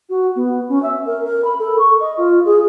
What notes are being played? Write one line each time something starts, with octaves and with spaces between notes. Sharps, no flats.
F#4
B3
C#4
E5
A#4
A#4
B5
A4
C#6
D#5
F4
G#4